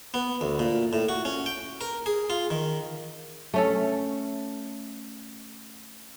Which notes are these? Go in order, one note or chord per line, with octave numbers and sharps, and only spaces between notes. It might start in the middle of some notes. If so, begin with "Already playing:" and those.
B3
D2
A#2
A2
F#4
C#4
G5
A#4
G#4
F4
D#3
A3 C#4 A4